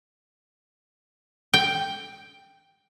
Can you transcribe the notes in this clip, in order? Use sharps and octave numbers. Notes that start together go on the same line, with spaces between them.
G5